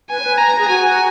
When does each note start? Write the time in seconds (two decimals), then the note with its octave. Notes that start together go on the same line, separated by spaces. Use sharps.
0.10 B4 G#5
0.20 C#5
0.24 B4
0.38 A#5
0.48 B4
0.58 G#4
0.68 F#4 G#5